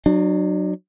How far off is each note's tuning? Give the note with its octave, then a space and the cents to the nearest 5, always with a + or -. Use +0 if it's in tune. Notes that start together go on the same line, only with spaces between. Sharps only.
F#3 +0 D4 +40